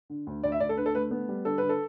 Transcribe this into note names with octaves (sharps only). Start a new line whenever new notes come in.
D3
D2
D2 D5
E5
D2 D5
A4
D3 B4
A4
A3 B4
B3
G3
D3 A4
D3 B4
A4